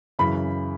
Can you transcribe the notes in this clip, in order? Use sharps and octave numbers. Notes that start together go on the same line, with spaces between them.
F#2 C#3 E3 B5